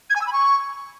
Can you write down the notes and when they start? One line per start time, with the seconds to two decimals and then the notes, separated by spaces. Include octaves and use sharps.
0.10 G#6
0.15 G#5
0.21 E6
0.27 B5
0.32 C#6